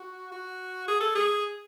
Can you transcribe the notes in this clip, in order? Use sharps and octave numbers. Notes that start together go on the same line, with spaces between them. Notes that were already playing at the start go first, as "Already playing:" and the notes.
Already playing: F#4
F#4
G#4
A4
G#4